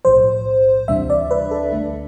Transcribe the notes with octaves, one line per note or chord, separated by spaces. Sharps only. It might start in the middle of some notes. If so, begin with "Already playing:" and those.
B1 A2 F3 C5
D2 C3 E3 G3 D4 E5
D5
B4
A4
D2 D3 A3 D4